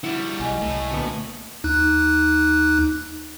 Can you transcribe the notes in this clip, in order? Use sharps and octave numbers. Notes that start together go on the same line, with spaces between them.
G3 E4 F#4
B1 D#5 G#5
C2 A2
D2 A#2 B3
D#2 D#4 F#6